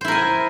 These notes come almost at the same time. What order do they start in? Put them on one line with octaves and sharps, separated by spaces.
C5 E4 A#4 G#5